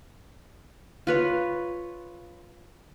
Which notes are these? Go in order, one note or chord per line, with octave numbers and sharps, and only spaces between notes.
F4 B4 C#5